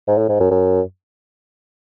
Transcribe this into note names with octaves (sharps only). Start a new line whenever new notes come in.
G#2
A2
G#2
F#2
F#2